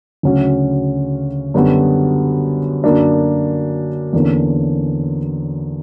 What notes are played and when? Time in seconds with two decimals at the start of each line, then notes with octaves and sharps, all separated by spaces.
0.23 D2 C#3 F#3 C#4 F#4
1.54 F#2 D3 G3 B3 F#4
2.84 F#2 D3 A#3 D4
4.13 E2 D3 A#3 C#4